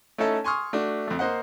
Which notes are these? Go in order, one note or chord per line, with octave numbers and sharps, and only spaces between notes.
A3 C#4 D#4 E4 A4
G#5 C6 C#6 D#6 F6
A3 D4 F#4
F2 A3
A#3 C5 D#5 F#5